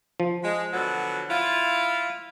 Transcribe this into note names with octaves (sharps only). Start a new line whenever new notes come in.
F3
G#3
B2 D3 F#3
E4 F4